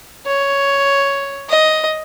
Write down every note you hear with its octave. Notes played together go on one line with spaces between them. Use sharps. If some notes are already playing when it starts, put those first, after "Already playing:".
C#5
D#5